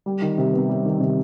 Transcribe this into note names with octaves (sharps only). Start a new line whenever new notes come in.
G3
D#3
C3
B3
G3
D#3
C3